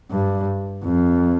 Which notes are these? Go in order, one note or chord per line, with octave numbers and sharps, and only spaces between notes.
G2
F2